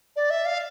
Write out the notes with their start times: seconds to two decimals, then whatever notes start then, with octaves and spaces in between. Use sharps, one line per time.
0.16 D5
0.30 E5
0.45 F5